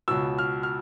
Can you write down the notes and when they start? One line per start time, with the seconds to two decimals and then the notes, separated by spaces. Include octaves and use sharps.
0.08 C#2 B2 E6
0.38 F6
0.63 F6